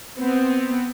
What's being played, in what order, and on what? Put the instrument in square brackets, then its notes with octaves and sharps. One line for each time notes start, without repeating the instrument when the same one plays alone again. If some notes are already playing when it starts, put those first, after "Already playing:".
[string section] B3 C4